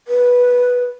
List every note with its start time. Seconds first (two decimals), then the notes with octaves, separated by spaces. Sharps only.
0.08 B4